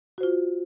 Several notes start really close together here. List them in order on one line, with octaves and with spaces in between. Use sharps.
F#4 C5 F4